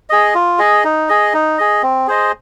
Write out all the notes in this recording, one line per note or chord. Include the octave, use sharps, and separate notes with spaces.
G#4 D#5
F4
G#4 D#5
D#4
G#4 D#5
D#4
G#4 D#5
C4
G#4 C5 D#5